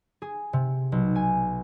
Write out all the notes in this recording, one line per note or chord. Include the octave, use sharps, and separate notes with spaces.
G#4
C3
B1
G#5